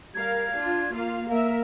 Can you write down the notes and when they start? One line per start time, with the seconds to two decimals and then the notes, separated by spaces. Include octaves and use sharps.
0.14 G3 A#4 F5 G#6
0.54 D4 F4
0.93 A#3 F4 F5
1.30 A#3 A#4 E5